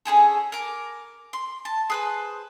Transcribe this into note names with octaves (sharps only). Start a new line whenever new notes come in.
C#4 E4 G#4 A4
A#4 D6
C6
A5
G#4 B4 C5